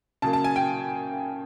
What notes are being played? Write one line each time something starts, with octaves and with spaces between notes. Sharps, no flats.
C#3 F#3 A#3 A5
A5
G#5
G5